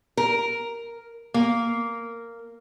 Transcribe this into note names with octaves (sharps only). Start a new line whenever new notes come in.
A#4
A#3